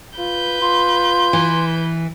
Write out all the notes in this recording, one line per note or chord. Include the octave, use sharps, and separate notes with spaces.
F4 B4 G6
F4 C6
E3